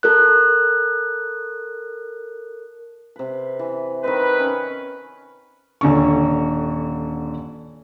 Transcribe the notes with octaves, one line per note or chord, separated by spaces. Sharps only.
A4 A#4 F#6
C3 B4
E3
D#3 C4 B4 D#5
C#4
D#1 D3 C#6